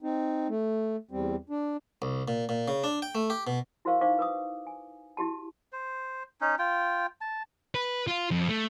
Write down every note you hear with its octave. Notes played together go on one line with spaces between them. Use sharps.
C4 D#4
A3
E2 G3 C4
D4
C2
A#2
A#2
C#3
D4
G5
A3
G4
B2
E4 F#4 A#4 C5 F5 C#6
D#4 C5 F5 C#6 D6
B4 D6 D#6
G#5
E4 F#4 G4 A5
C5
C#4 D#4
F4 G5
A5
B4
F4
F2
A3